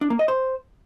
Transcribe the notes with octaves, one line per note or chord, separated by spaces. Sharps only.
D4
A#3
D#5
C5